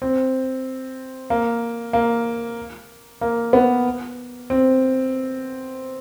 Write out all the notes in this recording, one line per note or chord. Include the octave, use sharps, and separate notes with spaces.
C4
A#3
A#3
A#3
B3
C4